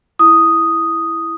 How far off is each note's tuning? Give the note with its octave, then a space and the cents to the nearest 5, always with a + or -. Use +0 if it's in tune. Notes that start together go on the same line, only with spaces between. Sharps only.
E4 +0 D#6 +0